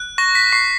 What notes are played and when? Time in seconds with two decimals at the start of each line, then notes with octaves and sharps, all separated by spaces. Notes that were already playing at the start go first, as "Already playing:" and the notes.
Already playing: F#6
0.18 C#6 A#6
0.35 B6
0.52 C#6 C7